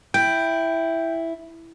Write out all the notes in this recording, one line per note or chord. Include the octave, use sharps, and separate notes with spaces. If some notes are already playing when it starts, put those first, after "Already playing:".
E4 G5